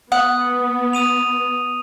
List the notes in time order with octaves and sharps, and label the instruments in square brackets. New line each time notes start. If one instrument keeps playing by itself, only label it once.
[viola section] B3 [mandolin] F#5 [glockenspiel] D#6
[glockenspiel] D#6 D#7 F7